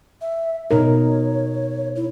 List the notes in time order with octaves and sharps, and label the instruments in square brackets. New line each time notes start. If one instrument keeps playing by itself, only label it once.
[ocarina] E5
[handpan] B2 D#4 A#4 [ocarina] C#5
[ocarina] E4